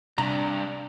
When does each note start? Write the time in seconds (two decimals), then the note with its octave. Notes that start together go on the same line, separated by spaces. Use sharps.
0.18 G2 C3 D4 A#5